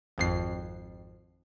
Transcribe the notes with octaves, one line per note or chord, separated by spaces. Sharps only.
G#1 F2 C7